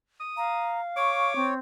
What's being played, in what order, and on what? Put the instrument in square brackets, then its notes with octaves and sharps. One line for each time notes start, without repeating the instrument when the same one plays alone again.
[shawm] D#6
[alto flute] F5 [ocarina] A#5
[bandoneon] C#5 [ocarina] C#6 [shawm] D6
[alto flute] C4